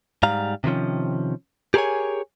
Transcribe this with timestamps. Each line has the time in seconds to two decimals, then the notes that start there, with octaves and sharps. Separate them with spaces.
0.23 G#2 G3 F5 A#5
0.64 C3 D#3 F3 C#4
1.74 G4 G#4 A#4 C5 C#5 G#5